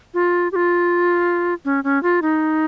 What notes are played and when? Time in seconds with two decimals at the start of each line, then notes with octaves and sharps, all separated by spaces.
0.14 F4
0.52 G4
0.56 F4
1.65 C#4
1.84 C#4
2.03 F4
2.22 D#4